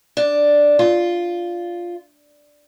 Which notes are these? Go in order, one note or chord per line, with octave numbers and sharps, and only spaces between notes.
D4
F4